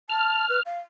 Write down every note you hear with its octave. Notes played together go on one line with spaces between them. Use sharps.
A5 F6
B4
F5